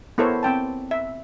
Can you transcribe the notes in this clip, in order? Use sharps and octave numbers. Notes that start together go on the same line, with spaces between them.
B3 E4 A4 A#4 C5 C#5
C4 G5 A5
E5